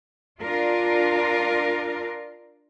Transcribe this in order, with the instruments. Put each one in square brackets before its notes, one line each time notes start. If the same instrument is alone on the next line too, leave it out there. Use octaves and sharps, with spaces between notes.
[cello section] D4 F4 A#4